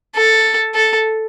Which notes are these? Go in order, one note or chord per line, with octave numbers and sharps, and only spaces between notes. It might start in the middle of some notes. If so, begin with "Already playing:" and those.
A4
A4